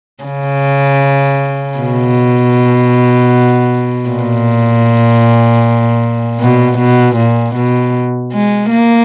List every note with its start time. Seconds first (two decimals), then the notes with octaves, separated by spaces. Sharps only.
0.24 C#3
1.79 B2
4.09 A#2
6.40 B2
6.78 B2
7.16 A#2
7.56 B2
8.33 G#3
8.70 A#3